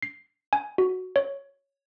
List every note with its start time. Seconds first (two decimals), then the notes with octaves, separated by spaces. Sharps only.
0.03 C7
0.53 G#5
0.78 F#4
1.16 C#5